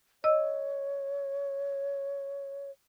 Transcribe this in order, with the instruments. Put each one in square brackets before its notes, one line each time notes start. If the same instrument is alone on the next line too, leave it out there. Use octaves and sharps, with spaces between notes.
[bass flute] C#5 [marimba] D#5 E6